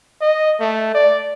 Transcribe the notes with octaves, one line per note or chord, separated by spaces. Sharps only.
D#5
A3
D5